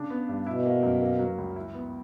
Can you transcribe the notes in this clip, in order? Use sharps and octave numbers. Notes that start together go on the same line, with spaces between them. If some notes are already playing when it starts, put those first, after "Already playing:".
Already playing: C#3 D4
B3
G2
B2 E4
A#3
F#2
A#3
F#3
C#2
E4
B3